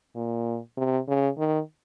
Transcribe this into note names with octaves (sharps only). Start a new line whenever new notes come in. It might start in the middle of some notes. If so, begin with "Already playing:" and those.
A#2
C3
C#3
D#3